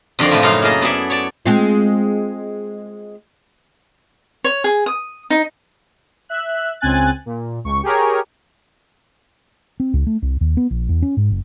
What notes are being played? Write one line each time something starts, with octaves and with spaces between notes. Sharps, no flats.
F2 D3 D#3 A#4 D5 C6
A2 C3 F3 E4 F4
F#2 C#3 D#4 C#5 F5 C6
A#3 E4 G#4 A#4 D#5 A5
B3 E4 G#4 A4 D5 E5
C#5 D5 A5
G#3 C4 F4
C#5
G#4
D#6
D#4
E5 F#6
C#2 C4 G#5 F#6 A6
A#2
C#2 C#6
G4 G#4 A#4 C#5
C4
C#2
A3
C2
D#2
B3
A#1
E2
C#4
G#2
F#1